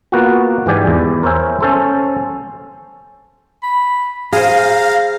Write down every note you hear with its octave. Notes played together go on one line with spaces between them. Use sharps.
A#3 B3 F4 F#4
G#2 E3 G4 D5 G#5
E2
A#4 C5 C#5 E5 G#5
C#4 A4 C5
B5
G#4 C5 F5 A#5